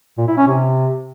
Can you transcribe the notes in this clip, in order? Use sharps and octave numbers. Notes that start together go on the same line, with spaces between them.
A#2
E4
C#4
C3